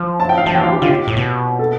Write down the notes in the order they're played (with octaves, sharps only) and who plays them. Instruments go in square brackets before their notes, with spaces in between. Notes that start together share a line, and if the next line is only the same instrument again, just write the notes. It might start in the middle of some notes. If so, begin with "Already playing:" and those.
Already playing: [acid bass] F3
[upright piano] A5
G5
F5
[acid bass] F3 [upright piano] A5
[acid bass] E3 [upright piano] G5
[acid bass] F3 [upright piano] F5
[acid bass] E3 [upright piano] G4
[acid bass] D3 [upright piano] F4
[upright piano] G4
[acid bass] A2
B2
[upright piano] A4